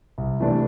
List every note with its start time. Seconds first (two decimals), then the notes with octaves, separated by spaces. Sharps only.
0.18 C2
0.40 C3 E3 A3 D4